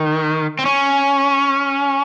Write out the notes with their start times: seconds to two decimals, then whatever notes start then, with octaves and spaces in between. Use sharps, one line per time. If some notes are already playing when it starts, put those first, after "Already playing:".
Already playing: D#3
0.59 C4
0.66 C#4